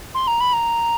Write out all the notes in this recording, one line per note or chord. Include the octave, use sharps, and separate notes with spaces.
C6
A#5
B5
A#5